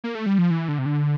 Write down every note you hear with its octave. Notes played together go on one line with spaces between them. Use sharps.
A#3
A3
G3
F3
E3
D3
C3
D3